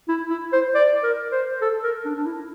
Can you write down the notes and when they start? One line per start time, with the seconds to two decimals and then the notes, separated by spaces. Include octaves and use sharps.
0.08 E4
0.30 E4
0.53 C5
0.75 D5
1.03 A#4
1.32 C5
1.61 A4
1.84 A#4
2.05 D4
2.16 D4
2.26 E4